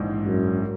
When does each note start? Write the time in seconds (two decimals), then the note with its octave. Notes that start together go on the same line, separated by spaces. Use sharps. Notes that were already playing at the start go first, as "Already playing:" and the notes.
Already playing: A#1 G#2 E3 G#3
0.26 F#2